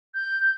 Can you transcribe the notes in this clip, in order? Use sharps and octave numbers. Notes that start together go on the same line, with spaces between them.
G6